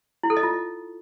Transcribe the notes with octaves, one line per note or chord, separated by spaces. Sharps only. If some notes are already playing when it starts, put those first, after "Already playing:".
E4
A4
D#5
F4